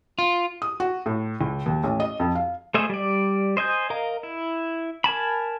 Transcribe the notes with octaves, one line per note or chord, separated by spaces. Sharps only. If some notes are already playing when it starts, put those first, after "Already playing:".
F4
D#6
F#4
A2
C#2
D#2
A1
D#5
F2
F5
A3 G#4 C5 D#5 E5
G3 D5
C5 D#5 G#5 G6
A#4 D#5 F5 A#5
E4
A#4 G#5 A5 B5